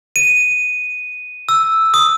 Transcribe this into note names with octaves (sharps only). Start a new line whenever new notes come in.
D#7
E6
D#6